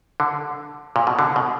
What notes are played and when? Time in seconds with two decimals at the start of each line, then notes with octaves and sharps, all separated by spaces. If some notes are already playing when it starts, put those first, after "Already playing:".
0.20 D3
0.96 A#2
1.07 B2
1.19 D3
1.36 B2